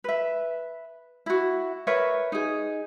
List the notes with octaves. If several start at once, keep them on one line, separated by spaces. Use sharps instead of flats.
B4 E5
E4 F#4
A#4 B4 C#5 E5
D#4 G#4